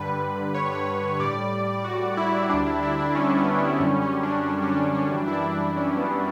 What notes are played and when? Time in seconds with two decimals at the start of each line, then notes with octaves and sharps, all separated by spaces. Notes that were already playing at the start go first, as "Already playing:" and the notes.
Already playing: G2 D3 G3 B4
0.54 C#5
1.20 A2 G3 D5
1.84 F#4
2.17 E4
2.49 D2 D3 G3 D4
2.67 E4
2.82 E4
2.99 D4
3.15 C#4
3.37 B3
3.58 D4
3.80 F#2 D3 G3 C#4
4.02 C#4
4.23 D4
4.46 D4
4.62 C#4
4.72 D4
4.78 C#4
4.95 C#4
5.11 F#2 E3 G3 D4
5.28 E4
5.33 D4
5.54 E4
5.76 C#4
5.97 B3